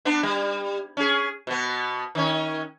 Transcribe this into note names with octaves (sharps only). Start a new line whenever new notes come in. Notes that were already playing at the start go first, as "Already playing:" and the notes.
B3 D4
G3
C#4 G#4
B2 B3
D#3 C#4